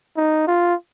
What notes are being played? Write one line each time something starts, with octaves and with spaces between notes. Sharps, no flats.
D#4
F4